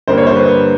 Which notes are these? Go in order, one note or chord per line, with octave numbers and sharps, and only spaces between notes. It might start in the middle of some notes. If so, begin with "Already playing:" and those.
G2 D3 G3 A#3 C5
C#5
C5
B4